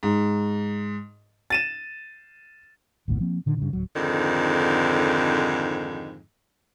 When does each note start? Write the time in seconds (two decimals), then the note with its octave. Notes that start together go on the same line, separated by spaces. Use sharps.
0.03 G#2
1.50 A6 D#7 E7
3.08 G#1 D2 G#2 B2
3.20 F3 A#3 C4
3.46 A#2 D3 D#3
3.58 G2 C#3
3.73 D1 F#3
3.96 F2 G#2 D3 D#3